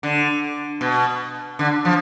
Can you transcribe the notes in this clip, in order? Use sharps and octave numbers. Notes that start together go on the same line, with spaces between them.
D3
B2
D3
F3